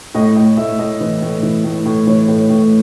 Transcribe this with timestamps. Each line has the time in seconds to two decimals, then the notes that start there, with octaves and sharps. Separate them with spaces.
0.14 A2 D#5
0.36 A2 D#5
0.57 A2 E5
0.79 A2 D#5
1.01 E3
1.22 A2
1.43 E3
1.64 A2
1.85 A2
2.07 E3 C#5
2.28 A2
2.50 A2